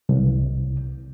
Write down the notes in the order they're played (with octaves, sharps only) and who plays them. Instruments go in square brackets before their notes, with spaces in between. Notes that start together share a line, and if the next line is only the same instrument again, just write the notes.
[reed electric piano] C2